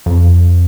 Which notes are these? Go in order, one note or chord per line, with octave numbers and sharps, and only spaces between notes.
F2